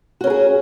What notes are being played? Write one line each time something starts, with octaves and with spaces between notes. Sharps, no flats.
C#4 F#4 G#4 A#4